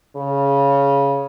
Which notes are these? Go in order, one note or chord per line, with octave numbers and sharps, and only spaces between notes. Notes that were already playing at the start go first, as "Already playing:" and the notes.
C#3